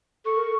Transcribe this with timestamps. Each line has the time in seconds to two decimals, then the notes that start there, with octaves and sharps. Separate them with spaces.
0.25 A4 C#6
0.37 A#4